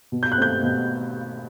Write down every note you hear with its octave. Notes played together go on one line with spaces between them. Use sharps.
B2
G6
F#6
A3 C4 G6
B2